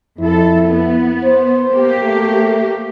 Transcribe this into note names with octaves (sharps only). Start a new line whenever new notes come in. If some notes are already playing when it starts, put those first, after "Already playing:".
F2 E4 A4
B3
C5
A#3 G4
A3